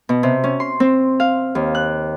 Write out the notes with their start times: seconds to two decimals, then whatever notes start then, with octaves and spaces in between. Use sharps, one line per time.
0.09 B2
0.23 C3
0.44 C#4
0.60 C6
0.80 C4
1.20 F5
1.55 D#2
1.75 F#6